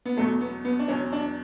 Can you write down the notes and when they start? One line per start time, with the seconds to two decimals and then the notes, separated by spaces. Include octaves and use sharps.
0.05 B3
0.17 E2 B2 F#3 A3
0.41 B3
0.65 B3
0.79 D4
0.88 E2 B2 F#3 C#4
1.13 D4